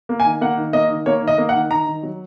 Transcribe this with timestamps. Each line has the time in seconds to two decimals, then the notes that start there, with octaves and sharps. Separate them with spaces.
0.09 A#3
0.20 G#5
0.25 D#3
0.41 A#3 F#5
0.58 D#3
0.73 A#3 D#5
0.90 D#3
1.06 A#3 C#5
1.22 D#3
1.28 D#5
1.38 A#3
1.49 F#5
1.55 D#3
1.70 D#3 A#5
1.86 D#3
2.03 F#3